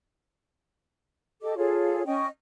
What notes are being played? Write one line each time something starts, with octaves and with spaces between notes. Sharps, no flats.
G4 A4 D#5 D6
F4 G#4 A4 C#5
C#4 D#5 G5 C#6